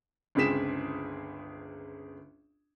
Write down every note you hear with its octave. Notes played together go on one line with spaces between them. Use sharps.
G1 C#2 C4 G#4 B6 E7